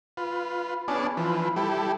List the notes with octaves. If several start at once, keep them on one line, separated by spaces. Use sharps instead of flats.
F4 B4
B3 C#4 D4 G#4 D5 A5
E3 F3 B4
G3 E4 G4 A4